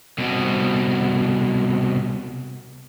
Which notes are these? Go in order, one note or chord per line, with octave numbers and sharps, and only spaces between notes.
C2 B2